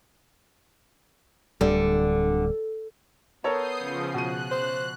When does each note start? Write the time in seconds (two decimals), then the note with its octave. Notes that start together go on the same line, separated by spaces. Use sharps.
1.61 D1 D3 G3
3.44 B3 A4 A#4 C#5 D#6 G6 C7
3.78 C#3 F3
4.14 B2 F#6 D#7
4.51 C5